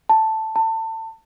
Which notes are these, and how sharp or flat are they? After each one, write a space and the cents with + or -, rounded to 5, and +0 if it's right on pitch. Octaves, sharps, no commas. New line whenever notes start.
A5 +5
A5 +30